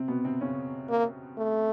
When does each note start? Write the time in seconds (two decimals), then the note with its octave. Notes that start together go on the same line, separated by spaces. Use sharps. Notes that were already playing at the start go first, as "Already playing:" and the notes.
Already playing: C3 C4
0.08 B2 B3
0.25 C3 C4
0.41 C#3 C#4
0.89 A#3
1.37 A3